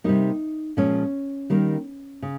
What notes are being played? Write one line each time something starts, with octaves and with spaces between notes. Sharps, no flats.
C3 G3 A#3 D#4
A#2 F3 G#3 C#4
D#3 G3 A#3
C#3